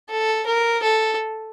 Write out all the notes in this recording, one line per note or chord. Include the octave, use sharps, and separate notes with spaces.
A4
A#4
A4